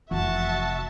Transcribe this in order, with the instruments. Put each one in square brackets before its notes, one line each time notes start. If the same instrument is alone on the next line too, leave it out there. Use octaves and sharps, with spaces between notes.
[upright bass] F1 C3 [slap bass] E3 F3 [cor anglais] F#4 [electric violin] E5 A5